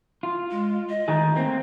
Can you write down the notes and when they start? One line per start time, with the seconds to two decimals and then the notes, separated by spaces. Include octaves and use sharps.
0.23 F4
0.51 G#3
0.89 D#5
1.08 D#3 A3 G#4
1.36 A3 A#3 C4